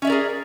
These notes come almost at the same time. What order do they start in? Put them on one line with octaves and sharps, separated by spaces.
C#4 E5 D5 A#4 G#4